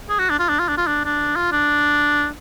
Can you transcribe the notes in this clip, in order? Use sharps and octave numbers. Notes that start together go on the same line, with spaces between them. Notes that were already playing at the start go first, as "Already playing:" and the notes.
G#4
F#4
D4
F4
D4
F4
D4
F4
D4
D4
F4
D4